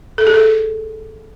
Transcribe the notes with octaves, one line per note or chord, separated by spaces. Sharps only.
A4
G#4
A4